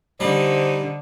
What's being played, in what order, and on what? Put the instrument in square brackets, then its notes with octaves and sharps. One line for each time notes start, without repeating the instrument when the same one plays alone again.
[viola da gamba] D3 [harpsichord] G3 [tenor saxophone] D#4 [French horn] C5